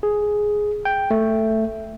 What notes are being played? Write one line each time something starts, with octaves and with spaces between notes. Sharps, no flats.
G#4
G5
A3